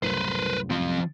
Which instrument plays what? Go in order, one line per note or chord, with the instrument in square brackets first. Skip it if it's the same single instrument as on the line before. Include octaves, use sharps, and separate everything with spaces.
[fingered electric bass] C2 F#2 A2 [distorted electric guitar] B4 C5
[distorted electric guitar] F3 C4